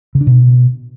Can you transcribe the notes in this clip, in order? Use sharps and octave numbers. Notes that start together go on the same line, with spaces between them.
C#3
D4
B2